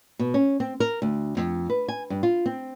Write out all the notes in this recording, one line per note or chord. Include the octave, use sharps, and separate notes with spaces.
B2
C#4
C4
A#4
D2
F2
B4
G#5
G2
F4
C4